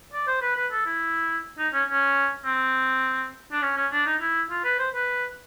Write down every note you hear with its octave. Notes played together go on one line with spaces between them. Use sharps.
D5
C5
B4
B4
A4
E4
D#4
C#4
C#4
C4
D4
C#4
C#4
D4
D#4
E4
F4
B4
C5
B4